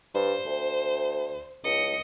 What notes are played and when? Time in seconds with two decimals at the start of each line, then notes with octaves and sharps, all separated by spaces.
0.15 G2 C5
0.46 D2
1.64 C#2 D#5 C#7